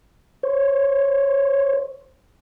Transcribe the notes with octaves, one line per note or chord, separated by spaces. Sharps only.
C5 C#5